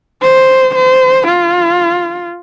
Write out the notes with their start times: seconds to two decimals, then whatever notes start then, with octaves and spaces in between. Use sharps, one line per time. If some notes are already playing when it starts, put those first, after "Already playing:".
0.22 C5
0.75 C5
1.27 F4